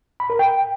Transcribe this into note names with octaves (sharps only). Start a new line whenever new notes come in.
B5
A#4
G5